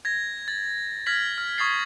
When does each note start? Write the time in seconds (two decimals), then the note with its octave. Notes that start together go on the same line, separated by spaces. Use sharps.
0.05 G#6 A#6
0.48 A6
1.06 F6 G#6 A#6 B6 F#7
1.38 F6
1.58 C#6 D#6 G#6 A6 C7